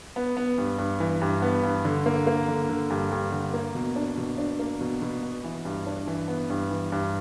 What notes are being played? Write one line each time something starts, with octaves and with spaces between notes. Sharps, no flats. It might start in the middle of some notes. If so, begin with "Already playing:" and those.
B3
B3
G2
G2
E3
G2
B3
G2
D3
A#3
A#3
D3
D3
G2
G2
D3
A#3
B2
D4
B2
D4
A#3
B2
B2
B3
E3
G2
D4
E3
B3
G2
E3
G2